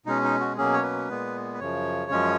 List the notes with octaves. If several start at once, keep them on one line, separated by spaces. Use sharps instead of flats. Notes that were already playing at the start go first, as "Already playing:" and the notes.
B2 G#3 C#4 D#4
D#4
F#4
B2 F#3 A#3 C#4 G#4
C#5
B4
A#2 G#3 B3
B4
F#2 C#3 F3 C#5
F#2 F3 G#3 C#4